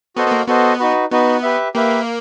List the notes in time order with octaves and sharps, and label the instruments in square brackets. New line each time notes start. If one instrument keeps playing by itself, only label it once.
[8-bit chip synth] B3 [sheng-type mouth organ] F#4 A4 C5 D#5
[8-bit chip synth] B3
A#3
[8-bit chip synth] B3 [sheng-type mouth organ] F#4 A4 C5 D#5
[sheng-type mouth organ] D#4 F#4 B4
[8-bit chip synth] B3 [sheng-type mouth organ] D#4 F#4 B4
[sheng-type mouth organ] G4 B4 E5
[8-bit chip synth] A#3 [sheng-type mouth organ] G4 B4 E5